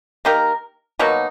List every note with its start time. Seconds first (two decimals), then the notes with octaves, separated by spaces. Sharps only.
0.25 A#3 D#4 G4 A#4
0.99 B2 F#3 A#3 D#4